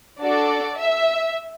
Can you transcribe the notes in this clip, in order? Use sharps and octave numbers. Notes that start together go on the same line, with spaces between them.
D4 F#4 A4 D5
E5